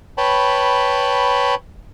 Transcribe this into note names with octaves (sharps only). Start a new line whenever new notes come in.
B4 C#5 G5 A5 B5